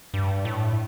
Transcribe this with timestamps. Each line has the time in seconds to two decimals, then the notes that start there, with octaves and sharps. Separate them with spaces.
0.14 G2
0.45 A2